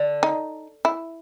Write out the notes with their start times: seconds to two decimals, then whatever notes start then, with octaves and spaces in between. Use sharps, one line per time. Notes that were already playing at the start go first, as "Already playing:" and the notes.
Already playing: D3
0.23 D#4
0.85 E4